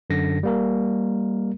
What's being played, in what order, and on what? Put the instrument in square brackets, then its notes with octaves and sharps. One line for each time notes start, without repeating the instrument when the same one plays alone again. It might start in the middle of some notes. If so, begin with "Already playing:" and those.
[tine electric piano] F#2 D3 A#6
G3 A#3 A#4